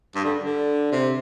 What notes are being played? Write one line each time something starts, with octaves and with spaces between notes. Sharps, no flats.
G2
D3
D3
C3